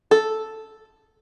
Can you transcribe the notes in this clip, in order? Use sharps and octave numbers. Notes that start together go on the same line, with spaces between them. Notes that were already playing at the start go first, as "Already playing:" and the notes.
A4